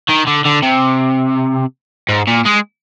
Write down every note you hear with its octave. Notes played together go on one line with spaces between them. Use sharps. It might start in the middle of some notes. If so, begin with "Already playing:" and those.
D#3
D3
D3
C3
G#2
A#2
G#3